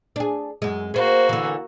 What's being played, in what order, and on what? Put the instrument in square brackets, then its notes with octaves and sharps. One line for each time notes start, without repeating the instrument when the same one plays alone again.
[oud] D4 G#4
F#2 G#3
[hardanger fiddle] A#3 F#4 [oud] G#4 C5
[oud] D3 E3